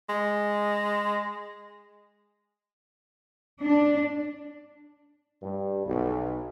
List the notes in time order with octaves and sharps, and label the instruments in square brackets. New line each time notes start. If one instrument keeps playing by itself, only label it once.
[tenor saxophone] G#3
[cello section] D4
[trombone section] G2
B1